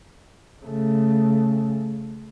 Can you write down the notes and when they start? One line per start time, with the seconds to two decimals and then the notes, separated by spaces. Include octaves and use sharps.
0.64 C#3 A3